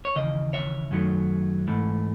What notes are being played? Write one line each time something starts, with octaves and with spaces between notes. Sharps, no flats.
C#5
D#2 C#3 E3 D#5
C#5 E5
F#2 D#3 F#3 A3
G#2 E3 A3